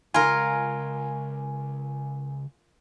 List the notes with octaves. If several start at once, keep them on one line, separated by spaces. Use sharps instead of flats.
C#2 F4 A#4 G#5